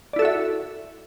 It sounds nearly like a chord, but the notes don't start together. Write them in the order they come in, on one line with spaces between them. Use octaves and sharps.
D5 E4 A4 F#4 E5